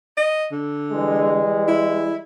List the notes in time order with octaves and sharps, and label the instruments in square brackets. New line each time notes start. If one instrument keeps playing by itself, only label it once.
[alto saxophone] D#5
D3
[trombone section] E3 G3 G#3
[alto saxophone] E4